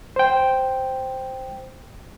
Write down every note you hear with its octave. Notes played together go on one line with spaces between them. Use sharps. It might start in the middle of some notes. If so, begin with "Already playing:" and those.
C5 G5